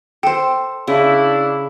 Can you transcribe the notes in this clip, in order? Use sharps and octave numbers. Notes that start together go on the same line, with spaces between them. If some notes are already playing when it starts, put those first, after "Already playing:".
A4 C5 G5
C#3 D4 E4